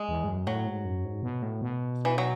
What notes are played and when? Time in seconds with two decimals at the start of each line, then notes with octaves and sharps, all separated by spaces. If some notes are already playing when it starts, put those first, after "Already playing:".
Already playing: G#3
0.09 E2
0.24 G#2
0.28 F#2
0.47 A2 F#3
0.66 G#2
0.85 F#2
1.04 G#2
1.23 B2
1.42 A2
1.62 B2
2.05 E3
2.18 F#3